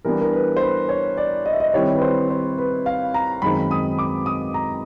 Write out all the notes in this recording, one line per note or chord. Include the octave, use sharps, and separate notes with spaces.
E3 G3 B3 D4 A#4
A#4
B4
C5
B4
C#5
D5
D#5
E5
D#5
D#3 G3 C4 E4 C#5
B4
C5
C5
B4
F5
A#5
F#2 D#3 G#3 C4 D#4 B5
D#6
D6
D#6
A#5